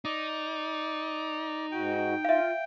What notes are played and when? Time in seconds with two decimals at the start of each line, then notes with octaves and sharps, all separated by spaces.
0.05 D#4 D5
1.72 G#2 F#4 G5
2.25 F4 E5 F5